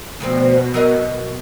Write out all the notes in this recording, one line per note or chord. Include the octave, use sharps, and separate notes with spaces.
D2 B2 F3 C4
F#3 A#4 D#5